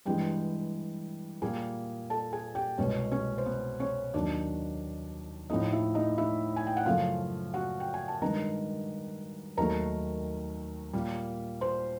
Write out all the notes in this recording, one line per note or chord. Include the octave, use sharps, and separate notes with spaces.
G2 E3 G#3 G4 G5
A#2 G3 A#3 G#4 G#5
A4 A5
G#4 G#5
G4 G5
C2 B2 G#3 C#4 C#5
C#4 C#5
C5
B3 B4
C#4 C#5
D#2 D#3 F#3 D4 D5
A2 F3 A3 D#4 D#5
E4 E5
D#4 D#5
E4 E5
G#5
G5
F#5
F#2 C#3 F3 A3 F4 F5
F#4 F#5
G5
G#5
A5
G2 D#3 G#3 A#4 A#5
D#2 D#3 F#3 A3 A#4 A#5
A#2 G3 A#3
C5 C6